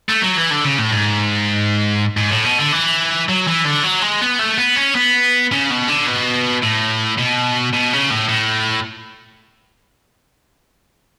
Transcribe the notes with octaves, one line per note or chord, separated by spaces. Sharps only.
A3
F#3
E3
D3
C#3
A2
G#2
G#2
A2
B2
D3
E3
F#3
E3
D3
F#3
G#3
B3
A3
B3
C#4
B3
C#3
B2
D3
B2
A2
B2
B2
C#3
A2
A2